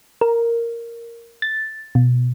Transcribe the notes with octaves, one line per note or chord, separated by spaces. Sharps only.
A#4
A6
B2